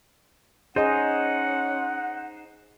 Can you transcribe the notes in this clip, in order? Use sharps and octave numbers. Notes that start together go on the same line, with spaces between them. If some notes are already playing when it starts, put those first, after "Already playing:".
C#4 D#4 G#4 C5 D#5 F#5